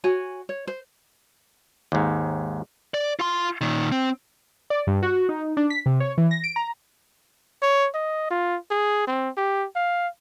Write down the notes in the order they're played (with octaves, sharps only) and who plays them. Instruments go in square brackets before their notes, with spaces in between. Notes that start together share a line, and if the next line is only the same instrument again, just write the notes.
[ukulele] F#4 C#5 G#5
C#5
C5
[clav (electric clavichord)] D#2 G#2
[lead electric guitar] D5
F4 C6
A#2 D#3
C4
[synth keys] D5
G2
F#4
D#4
D4
B6
C3
C#5
E3
A#6
D7
A#5
[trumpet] C#5
D#5
F4
G#4
C4
G4
F5